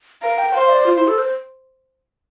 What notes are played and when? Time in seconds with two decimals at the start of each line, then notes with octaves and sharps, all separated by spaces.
0.22 A#4 F5
0.38 G5
0.54 C5 F5
0.70 D5
0.86 F4
0.97 E4
1.07 A4
1.18 C5